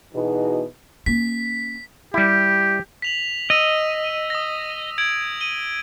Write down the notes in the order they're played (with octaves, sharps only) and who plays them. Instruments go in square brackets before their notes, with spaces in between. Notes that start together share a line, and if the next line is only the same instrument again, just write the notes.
[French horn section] B2 E3 B3 D#4 F#4 G#4
[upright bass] A#3 C#4 [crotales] B6
[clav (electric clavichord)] G3 E4 [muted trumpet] G4
[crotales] B6 F7 F#7
[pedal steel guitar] D#5 [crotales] E6 A#6 D#7
[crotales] D#6 A#6
G#6 D7 F#7
D#7 G7